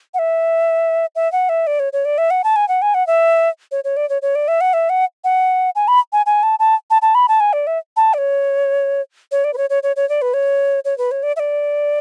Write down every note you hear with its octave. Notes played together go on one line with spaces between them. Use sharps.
F#5
E5
E5
F#5
E5
D5
C#5
C#5
D5
E5
F#5
A5
G#5
F#5
G#5
F#5
E5
C#5
C#5
D5
C#5
C#5
D5
E5
F#5
E5
F#5
F#5
G#5
B5
G#5
G#5
A5
A5
A5
A5
B5
A5
G#5
D5
E5
A5
D5
C#5
C#5
D5
B4
C#5
C#5
C#5
C#5
D5
B4
C#5
C#5
B4
C#5
D5
E5
D5